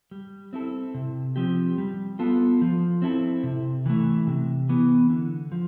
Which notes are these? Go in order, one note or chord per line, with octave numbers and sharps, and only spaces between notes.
G3
C4 E4 A4
C3
F3 C4 G4
G3
B3 F4 A4
F3
C4 E4 A4
C3
E3 A3
C3
E3 B3
D3
F3